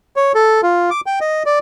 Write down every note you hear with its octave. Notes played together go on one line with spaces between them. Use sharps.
C#5
A4
F4
D6
G5
D#5
D5